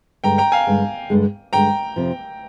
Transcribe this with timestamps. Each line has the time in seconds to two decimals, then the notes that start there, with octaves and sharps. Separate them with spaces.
0.24 G2 D3 G#3 G5 A#5
0.38 G5 A#5
0.52 F5 G#5
0.67 G2 D3 G#3
1.10 G2 D3 G#3
1.53 G2 D3 G#3 G5 A#5
1.96 F2 C3 F3